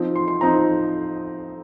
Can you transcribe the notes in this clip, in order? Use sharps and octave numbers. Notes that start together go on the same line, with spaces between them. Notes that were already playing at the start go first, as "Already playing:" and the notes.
Already playing: F3 C4 D#4
C6
C6
F3 C4 D#4 A#5